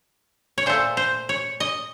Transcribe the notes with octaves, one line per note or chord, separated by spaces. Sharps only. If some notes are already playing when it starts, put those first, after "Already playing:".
C#5
A#2 A3 C5
C5
C#5
D#5